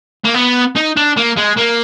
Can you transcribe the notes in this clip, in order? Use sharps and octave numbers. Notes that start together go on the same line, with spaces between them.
A#3
B3
D#4
D4
A#3
G#3
A#3